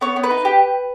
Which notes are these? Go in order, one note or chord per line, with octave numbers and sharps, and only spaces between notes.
B3 C#5
B3
B4
D#4
G4